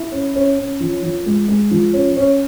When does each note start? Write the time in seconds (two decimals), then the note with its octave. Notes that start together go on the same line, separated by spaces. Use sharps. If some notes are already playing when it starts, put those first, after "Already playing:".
Already playing: E4
0.12 C#4
0.35 C#4
0.57 C#4
0.80 F3
1.03 F3
1.26 G#3
1.48 G#3
1.71 F3
1.93 C#4
2.17 C#4